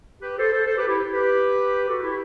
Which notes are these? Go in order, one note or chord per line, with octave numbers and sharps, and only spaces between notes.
G4 B4
A4 C5
A4 C5
A4 C5
G4 B4
E4 G4
G4 B4
F#4 A4
E4 G4